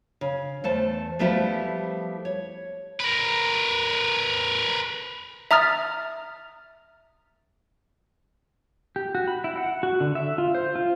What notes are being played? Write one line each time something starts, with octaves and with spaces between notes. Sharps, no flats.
C#3
E2 A3 C5 A5
F3 G3 A3 B3 E4 G4
C#5
A#4 B4
E5 A#5 D#6 F6 A6
G4
F#4
B5
E4
F#5
F#4
D3
E5
F4
C5
F4